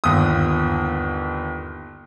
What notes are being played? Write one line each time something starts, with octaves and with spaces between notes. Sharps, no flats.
G1 D#2 D#6